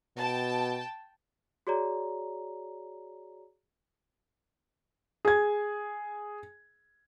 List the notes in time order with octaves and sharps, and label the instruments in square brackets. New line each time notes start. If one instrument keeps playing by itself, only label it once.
[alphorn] B2 [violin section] G5 A5
[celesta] F#4 G#4 C#5 D5 A#5
[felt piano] G#4 G#6